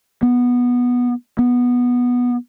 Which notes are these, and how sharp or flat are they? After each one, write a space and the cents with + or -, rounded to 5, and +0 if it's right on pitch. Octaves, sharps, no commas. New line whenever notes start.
B3 -10
B3 -10